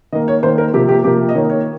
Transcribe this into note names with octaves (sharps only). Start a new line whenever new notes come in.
D#3 A#3 D#5
C#5
D#3 A#3 C5
A#4
C3 F3 A#3 G4
G4
C3 F3 A#3 G4
D#5
D#3 A#3 C#5
C#5